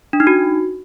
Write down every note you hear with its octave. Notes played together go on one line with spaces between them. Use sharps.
D4
D#4
F#4